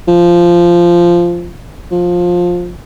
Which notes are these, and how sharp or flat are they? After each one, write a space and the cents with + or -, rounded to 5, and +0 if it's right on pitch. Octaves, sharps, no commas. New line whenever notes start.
F3 -10
F3 +15